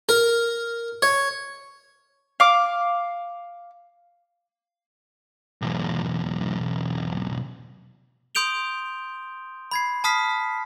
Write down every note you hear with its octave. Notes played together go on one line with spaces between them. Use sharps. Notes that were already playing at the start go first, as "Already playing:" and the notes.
A#4
C#5
F5 D6
B1 E2
C6 D#6 G6 D7 F7 G7
B5 G#6 C7
A5 B5 D#6 F6 B6 C7